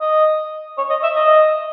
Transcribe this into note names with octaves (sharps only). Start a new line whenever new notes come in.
D#5
C#5
D#5
E5
D#5